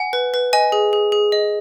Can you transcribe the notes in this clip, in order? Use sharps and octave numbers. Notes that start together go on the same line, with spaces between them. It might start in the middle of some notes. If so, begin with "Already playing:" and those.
Already playing: F#5 G#5
B4
B4
D#5 G#5
G#4
G#4
G#4
D#5